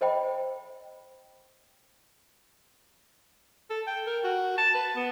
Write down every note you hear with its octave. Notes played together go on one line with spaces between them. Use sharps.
A4 C5 D#5 G5 B5
A4
G5
A#4
F#4
A5
B4
B3